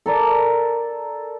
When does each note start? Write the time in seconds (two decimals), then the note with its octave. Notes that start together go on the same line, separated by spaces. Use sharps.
0.06 A4 A#4 D5